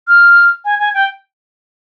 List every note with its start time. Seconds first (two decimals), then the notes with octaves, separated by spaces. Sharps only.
0.08 F6
0.65 G#5
0.79 G#5
0.94 G5